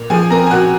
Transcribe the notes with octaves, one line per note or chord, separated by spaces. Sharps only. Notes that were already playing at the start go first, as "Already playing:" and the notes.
Already playing: A#2
F3 G#4 G#5
C4 A#4 A#5
G#5
A#2 F#4 F#5